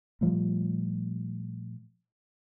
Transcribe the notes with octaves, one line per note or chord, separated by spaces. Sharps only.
A#2 F3 G3 A3